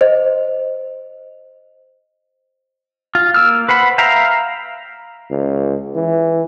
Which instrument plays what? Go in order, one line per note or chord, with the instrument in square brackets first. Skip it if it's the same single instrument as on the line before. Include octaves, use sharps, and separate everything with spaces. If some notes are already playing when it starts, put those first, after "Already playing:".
[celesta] C5 D#5
[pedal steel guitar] F4
A#3 E6 F6
B4 C5 F#5 B5
E5 F5 G5 A#5
[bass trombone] C#2
E3